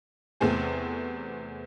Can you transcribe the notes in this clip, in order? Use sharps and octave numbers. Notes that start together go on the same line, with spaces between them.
E2 C3 A3 C4 G#4